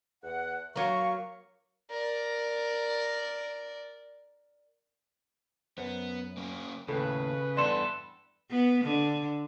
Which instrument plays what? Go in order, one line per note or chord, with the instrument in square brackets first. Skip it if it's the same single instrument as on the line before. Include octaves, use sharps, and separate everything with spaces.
[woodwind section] E2 F#5
[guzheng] F#3 A#3 [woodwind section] F5 C#6
[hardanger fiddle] A#4 D5
[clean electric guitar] F#2 [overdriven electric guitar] B3 [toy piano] C5
[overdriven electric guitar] A#3 C#4
[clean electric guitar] D#2 A2 [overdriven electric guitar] C#3 [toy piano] A4 [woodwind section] B4
[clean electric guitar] E2 G2 A4 [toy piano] D5 C6
[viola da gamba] B3
D3